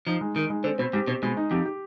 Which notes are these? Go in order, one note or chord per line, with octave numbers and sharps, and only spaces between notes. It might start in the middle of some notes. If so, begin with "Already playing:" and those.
F3 D#4
G#3
D#3 D#4
G#3
D3 C4
B2 C4
G#2 G4
B2 C4
B2 G#3
D#4
F2 G4
G4